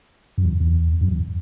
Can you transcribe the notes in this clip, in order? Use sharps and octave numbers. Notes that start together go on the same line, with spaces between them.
F#2
E2
E2
F#2
E2